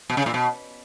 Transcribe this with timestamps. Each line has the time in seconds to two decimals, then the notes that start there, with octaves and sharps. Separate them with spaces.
0.10 B2
0.17 C#3
0.26 A#2
0.34 B2